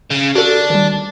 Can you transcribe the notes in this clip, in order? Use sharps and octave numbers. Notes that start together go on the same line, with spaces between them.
C#3
D4 F#4 A4
D#3 G3